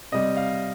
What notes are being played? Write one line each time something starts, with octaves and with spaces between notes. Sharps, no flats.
C3 G3 D#5
F5